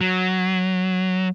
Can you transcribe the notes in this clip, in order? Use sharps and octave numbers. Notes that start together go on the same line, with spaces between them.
F#3